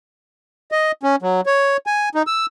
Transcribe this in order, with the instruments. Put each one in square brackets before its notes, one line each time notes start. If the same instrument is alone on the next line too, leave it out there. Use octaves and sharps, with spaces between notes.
[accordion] D#5
C#4
F#3
C#5
G#5
D#4
E6